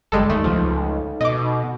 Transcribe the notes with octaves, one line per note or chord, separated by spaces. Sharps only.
G1 G3 G#3 A4
D#2 A3 D#4 A4
C#2 F3
B2 D#5 D6